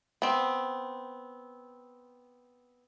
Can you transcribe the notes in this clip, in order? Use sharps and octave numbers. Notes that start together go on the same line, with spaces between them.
B3 C4